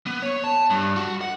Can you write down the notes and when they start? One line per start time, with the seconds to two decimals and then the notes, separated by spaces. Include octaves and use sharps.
0.06 B3
0.22 C#5
0.44 A5
0.70 G2
0.96 F#4
1.21 F#5